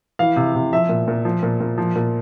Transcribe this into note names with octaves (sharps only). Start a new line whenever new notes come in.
E3 F5
C3
C3
F3 E5
A#2
A#2
F3
A#2
A#2
F3
A#2